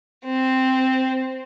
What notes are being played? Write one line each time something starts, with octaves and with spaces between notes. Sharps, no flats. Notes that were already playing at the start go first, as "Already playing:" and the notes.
C4